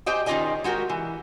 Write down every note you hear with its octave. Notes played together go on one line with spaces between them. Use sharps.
G4 C5 D#5 G5 G#5
D#3 C#4 F4 G4 D#5 G#5
G#3 F#4 G4 A#4
E3